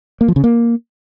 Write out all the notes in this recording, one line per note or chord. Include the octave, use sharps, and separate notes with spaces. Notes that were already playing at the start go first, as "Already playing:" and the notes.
A#3
F3
C#3
A#3